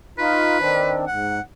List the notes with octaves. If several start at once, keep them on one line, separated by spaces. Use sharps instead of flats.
D#4 F4 B4
D#3 C4 D4
G#2 F#5